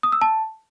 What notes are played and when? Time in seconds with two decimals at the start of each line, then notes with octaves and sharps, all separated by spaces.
0.03 D#6
0.12 E6
0.21 A5